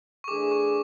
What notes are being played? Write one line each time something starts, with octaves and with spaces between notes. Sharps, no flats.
C#6
E3 A3 D4 G#4 D6
C#6